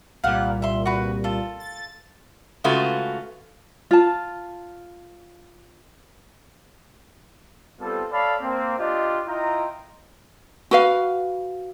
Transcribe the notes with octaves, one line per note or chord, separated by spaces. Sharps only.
C2 A#2 G3 F5 F#5
E5 C6
F#4 B4
F4 A4
A6
C#3 G#3 A3 F4 F#4 B4
F4 A5
G3 B3 C4 F4 A4
A4 C#5 D5 F5 A5 B5
A#3 C4
D4 F4 G4 D5 D#5
E4 F4 D#5 G5 A#5
F#4 B4 F5